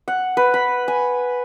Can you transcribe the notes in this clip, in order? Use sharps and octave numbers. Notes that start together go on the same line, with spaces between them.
F#5
B4
B5
G#5